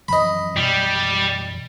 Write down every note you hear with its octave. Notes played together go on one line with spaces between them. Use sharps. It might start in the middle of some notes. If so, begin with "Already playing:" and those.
F#2 E3 F3 D#5 B5
F#2 B2 E3 G3